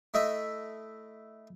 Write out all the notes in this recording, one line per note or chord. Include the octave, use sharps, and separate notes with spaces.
A3 E4 D#5 E5